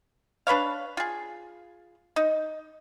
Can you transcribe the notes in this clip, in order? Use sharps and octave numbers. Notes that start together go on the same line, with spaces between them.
D4 B4 C#5 F5
F4 G#4
D#4